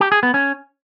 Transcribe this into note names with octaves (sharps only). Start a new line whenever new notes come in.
G4
G#4
B3
C#4